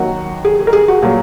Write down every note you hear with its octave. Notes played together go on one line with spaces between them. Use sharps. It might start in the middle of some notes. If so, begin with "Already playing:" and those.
Already playing: D#2 D#3 F#3 F#4
G#4
G#4
A#4
G#4
F#4
A#2 F#3 G#4